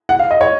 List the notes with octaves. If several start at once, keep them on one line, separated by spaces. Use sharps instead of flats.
F#5
F5
D#5
C#5